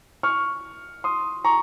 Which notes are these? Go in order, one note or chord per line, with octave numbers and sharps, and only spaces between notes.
C#6 F6
C6 D#6
A#5 C#6